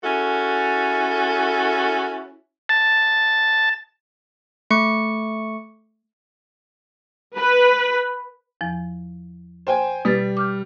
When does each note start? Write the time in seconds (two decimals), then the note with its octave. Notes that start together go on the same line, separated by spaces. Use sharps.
0.04 C#4 E4 F#4 G#4 A4
2.69 A5
4.70 A3 C#6 C#7
7.36 B4
8.61 E2 F3
9.67 C5 G5 G#5
10.05 B2 G3 B4 A6
10.37 D6 F6 G6